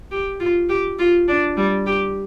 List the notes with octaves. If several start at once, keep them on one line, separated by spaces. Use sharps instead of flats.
G4
F4
G4
F4
D4
G3
G4